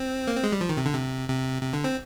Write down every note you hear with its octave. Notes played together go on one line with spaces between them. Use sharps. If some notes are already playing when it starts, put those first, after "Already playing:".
Already playing: C4
A#3
C4
G#3
G3
F3
D#3
C3
D3
C3
C3
C3
D3
C4